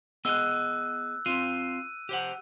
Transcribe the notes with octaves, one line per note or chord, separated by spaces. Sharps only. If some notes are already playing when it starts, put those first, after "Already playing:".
B3 G#4 D#5 E6 F#6
C4 F4 D#7
G4 C5 F#5